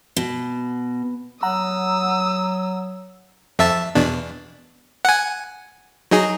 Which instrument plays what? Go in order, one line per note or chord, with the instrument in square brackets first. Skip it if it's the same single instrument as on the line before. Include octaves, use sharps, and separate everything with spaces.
[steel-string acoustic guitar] B2
[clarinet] F#3 [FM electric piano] F#5 A#5 [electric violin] D#6 E6
[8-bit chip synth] F2 E5 A5
E2 B2 D4
F#5 G#5
F#3 D#4 G#4